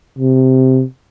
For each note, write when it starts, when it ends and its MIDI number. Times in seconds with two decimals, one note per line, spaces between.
0.18 0.83 48